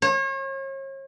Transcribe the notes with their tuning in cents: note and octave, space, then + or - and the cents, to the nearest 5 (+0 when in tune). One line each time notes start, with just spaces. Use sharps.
C#5 -40